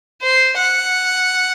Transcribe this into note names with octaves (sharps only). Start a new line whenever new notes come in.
C5
F#5